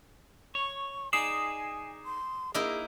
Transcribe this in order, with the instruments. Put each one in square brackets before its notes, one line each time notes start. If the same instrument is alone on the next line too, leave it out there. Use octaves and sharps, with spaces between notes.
[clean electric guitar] C#5 [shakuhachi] C#6
[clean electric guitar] D#4 G#4 D5 [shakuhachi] G#5 [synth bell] D#6 C7 E7
[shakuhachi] C6
[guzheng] A#3 D#4 E4 [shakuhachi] G#4